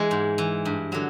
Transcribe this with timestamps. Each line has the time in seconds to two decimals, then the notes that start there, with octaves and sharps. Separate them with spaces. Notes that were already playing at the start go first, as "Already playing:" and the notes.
Already playing: E3 G#3
0.11 G#2
0.38 E3
0.65 G2
0.92 D3 F#3